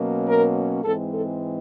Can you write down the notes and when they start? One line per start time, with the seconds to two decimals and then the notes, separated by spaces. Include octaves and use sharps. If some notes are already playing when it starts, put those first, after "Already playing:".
Already playing: B2 F#3 A#3 C#4
0.26 A#4
0.84 G#2 E3 G#3 C4 A4
1.12 A4